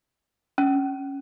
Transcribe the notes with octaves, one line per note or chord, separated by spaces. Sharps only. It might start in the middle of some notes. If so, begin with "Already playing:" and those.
C#4